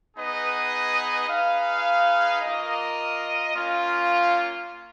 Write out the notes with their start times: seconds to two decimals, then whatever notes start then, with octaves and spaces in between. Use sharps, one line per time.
0.15 B3 D#4 G#4 B4 D#5
1.28 D#4 G#4 B4 F5
2.40 A#3 F4 A#4 D#5
3.53 A#3 C#4 F4